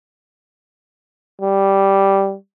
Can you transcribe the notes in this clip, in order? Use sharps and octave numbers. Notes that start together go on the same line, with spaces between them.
G3